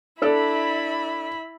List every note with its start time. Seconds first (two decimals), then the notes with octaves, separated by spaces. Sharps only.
0.22 D4 E4 A4 D5 B5